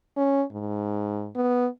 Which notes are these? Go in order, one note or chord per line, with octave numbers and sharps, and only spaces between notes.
C#4
G#2
B3